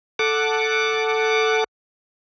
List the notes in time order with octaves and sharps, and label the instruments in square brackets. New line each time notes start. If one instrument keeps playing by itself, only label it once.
[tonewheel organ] A4 F#5 D6